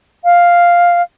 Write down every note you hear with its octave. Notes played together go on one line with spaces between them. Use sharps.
F5